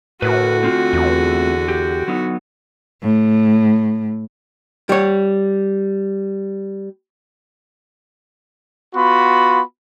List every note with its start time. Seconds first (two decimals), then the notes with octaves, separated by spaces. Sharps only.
0.22 A2 D3 E4 F#4 A#4 B4
0.63 A3 C4 F4
0.93 E2
1.68 G4
2.08 F#3 B3 D#4
3.02 A2
4.89 G3 C#5
8.95 B3 F4 F#4 B5